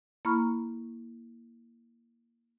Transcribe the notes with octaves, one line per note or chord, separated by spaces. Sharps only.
A#3 E4 A#5 B5 C#6 F6